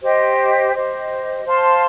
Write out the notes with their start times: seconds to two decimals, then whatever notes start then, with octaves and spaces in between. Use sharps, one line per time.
0.03 G4 C5 D#5
0.73 G4 C5 D#5
1.44 C5 F5 A5 C6